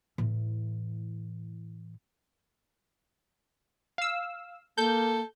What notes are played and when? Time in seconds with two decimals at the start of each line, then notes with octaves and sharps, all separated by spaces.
0.18 A2 E3
3.98 F5 E6
4.78 A#3 A4 G6